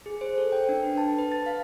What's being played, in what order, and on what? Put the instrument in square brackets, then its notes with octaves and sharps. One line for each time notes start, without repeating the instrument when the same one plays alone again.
[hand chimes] G#4
C5
A4
G5
D4
B4
A5
B4
A6
F5